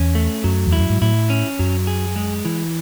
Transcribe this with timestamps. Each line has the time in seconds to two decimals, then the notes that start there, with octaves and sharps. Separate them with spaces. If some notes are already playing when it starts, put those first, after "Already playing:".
Already playing: E2 C#4
0.15 A3
0.44 F#2 F#3
0.66 E2
0.73 E4
0.79 F#2
0.90 G#2
1.01 A2 E4
1.30 C#4
1.59 F#2 F#3
1.87 G#4
2.16 G#3
2.45 E3